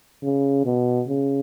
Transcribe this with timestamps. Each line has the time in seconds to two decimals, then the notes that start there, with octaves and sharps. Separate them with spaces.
0.23 C#3
0.65 B2
1.08 C#3